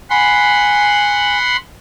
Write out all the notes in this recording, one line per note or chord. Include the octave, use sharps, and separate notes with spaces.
F#5 G#5 B5 C6